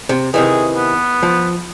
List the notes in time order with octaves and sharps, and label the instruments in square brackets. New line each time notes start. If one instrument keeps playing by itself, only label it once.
[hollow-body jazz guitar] C3
[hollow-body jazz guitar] C3 D#3 E3 [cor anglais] G#4
[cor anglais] B3
[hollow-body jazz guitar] F3